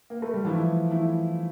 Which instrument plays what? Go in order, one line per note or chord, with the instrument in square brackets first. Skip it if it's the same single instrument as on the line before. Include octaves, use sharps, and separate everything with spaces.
[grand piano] A#3
A3
G3
[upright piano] E3 A3 E4 [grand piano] F3
[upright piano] E3 A3 E4